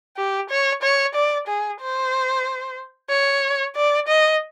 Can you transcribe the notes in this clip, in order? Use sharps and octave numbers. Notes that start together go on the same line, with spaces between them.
G4
C#5
C#5
D5
G#4
C5
C#5
D5
D#5